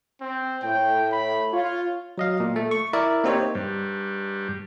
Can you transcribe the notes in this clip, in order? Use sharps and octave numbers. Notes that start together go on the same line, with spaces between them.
C4
A2 G5
B5
F4 C#5
F#3 D#5 F5
A#2
A3
C#6
E4 A#4 D5 E5
A#3 C4 D#4 G4 C5 C#5
G2